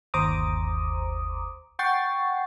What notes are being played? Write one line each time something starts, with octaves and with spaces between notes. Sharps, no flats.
G1 D#2 C5 A#5 D6 D#6
F#5 G5 C#6 A6 C7